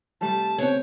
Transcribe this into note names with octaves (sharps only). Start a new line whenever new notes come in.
C3 G3 A3 A5
C#3 B3 C4 C#5